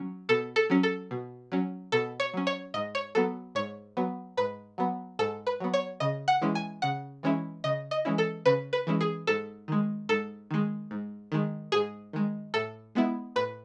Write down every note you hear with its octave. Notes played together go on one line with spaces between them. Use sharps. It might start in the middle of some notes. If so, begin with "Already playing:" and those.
Already playing: F#3 C#4
B2 A4
A4
F#3 C#4
A4
B2
F#3 C#4
B2 A4
C#5
F#3 C#4
C#5
G#2 D#5
C#5
F#3 B3 A4
G#2 C#5
F#3 B3
G#2 B4
F#3 B3
G#2 A4
B4
F#3 B3
C#5
C#3 D#5
F#5
E3 G#3 C#4 E4
G#5
C#3 F#5
E3 G#3 C#4 E4
C#3 D#5
D#5
E3 G#3 C#4 E4
A4
C#3 B4
B4
E3 G#3 C#4 E4
G#4
G#2 A4
D#3 G#3
G#2 A4
D#3 G#3
G#2
D#3 G#3
G#2 G#4
D#3 G#3
A2 A4
G#3 B3 E4
A2 B4